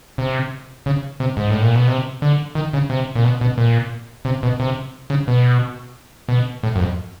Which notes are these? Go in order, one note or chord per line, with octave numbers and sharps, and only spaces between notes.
C3
C#3
C3
G#2
A2
A#2
B2
C3
D3
D#3
C#3
C3
A#2
B2
B2
A#2
C3
B2
C3
C#3
B2
B2
A2
F#2
F2